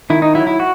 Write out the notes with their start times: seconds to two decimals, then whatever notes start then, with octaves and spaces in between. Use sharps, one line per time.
0.10 D#3 E4
0.22 D#4
0.35 F#3 E4
0.47 E4
0.60 F#4